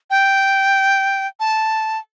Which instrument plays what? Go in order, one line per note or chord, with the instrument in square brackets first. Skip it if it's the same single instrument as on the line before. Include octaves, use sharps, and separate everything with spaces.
[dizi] G5
A5